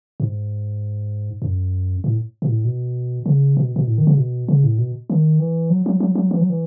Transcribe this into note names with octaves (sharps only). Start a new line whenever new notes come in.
G#2
F#2
A2
B2
A2
B2
C#3
B2
B2
A2
D#3
C#3
B2
C#3
A2
B2
D#3
E3
F#3
F#3
F#3
F#3
E3
F#3
E3